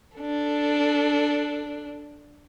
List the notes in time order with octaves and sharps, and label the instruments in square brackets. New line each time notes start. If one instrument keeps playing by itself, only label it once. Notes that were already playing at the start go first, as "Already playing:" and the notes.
[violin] D4 A4